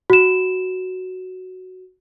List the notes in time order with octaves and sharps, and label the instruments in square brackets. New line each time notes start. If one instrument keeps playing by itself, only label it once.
[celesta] F#4 E7